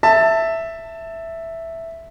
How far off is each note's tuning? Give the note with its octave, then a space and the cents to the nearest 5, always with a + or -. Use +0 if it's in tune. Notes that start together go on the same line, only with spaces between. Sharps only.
E5 +0 A5 +20